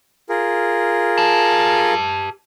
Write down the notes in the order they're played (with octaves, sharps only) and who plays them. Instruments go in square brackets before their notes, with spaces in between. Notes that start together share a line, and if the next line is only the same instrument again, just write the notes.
[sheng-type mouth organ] F4 G#4 A#4
[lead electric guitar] G4 A5